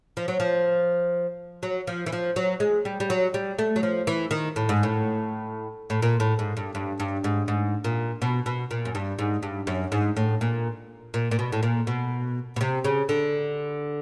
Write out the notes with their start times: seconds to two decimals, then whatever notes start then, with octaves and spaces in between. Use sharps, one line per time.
0.17 F3
0.28 F#3
0.40 F3
1.63 F#3
1.87 F3
2.06 E3
2.13 F3
2.36 F#3
2.60 G#3
2.85 G3
3.00 G3
3.10 F#3
3.34 G3
3.59 A3
3.76 F#3
3.83 F3
4.07 E3
4.31 D#3
4.56 A2
4.69 G#2
4.83 A2
5.90 A2
6.02 A#2
6.20 A2
6.39 G#2
6.57 G2
6.75 G2
7.00 G2
7.24 G#2
7.48 G#2
7.84 A#2
8.22 B2
8.46 B2
8.71 A#2
8.85 F#2
8.95 G2
9.19 G#2
9.43 G2
9.67 F#2
9.92 G#2
10.17 A2
10.41 A#2
11.14 A#2
11.31 A#2
11.39 B2
11.52 A2
11.63 A#2
11.87 B2
12.56 B2
12.61 C3
12.84 C#3
13.09 D3